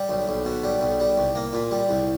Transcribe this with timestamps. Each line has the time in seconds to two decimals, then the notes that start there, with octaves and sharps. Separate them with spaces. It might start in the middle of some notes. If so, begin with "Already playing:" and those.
Already playing: G3
0.09 B1
0.28 B1
0.45 B2
0.64 G3
0.81 B1
1.00 G3
1.17 C2
1.35 A#3
1.53 A#2
1.71 G3
1.89 C2